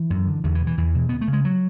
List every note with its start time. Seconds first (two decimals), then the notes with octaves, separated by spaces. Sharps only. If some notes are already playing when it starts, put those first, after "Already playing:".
Already playing: E3
0.10 F#2
0.27 D3
0.44 E2 D3
0.55 E3
0.61 B2
0.67 E3
0.77 E2 E3
0.95 B2
1.09 D2 B3
1.21 A3
1.28 C#3
1.33 G#3
1.45 F#3